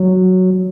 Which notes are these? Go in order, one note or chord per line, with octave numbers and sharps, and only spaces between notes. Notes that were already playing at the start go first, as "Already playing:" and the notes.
Already playing: F#3